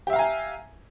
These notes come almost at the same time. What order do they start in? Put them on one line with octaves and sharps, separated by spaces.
G4 E5 F5 A#5 G#5